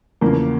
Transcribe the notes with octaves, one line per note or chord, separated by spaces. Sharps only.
E2 C#3 F3 A#3